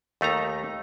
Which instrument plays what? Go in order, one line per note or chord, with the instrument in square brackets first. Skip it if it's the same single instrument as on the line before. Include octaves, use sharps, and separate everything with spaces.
[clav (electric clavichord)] D#2 A3 D#4 A#5